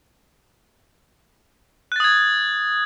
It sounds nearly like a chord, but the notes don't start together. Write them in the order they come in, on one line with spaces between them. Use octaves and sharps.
F#6 A6 D#6 G#6